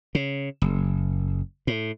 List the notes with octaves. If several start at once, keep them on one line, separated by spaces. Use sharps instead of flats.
C#3
F#1
A2